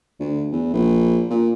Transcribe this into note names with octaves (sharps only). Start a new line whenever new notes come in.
D2
E2
A#1
A#2